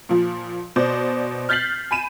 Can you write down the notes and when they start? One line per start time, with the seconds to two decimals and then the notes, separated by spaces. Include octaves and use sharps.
0.09 A#2 F3
0.76 B2 C5 D5
1.49 F6 G6 A6 B6 C7 F#7
1.91 G#5 B5 D#7 E7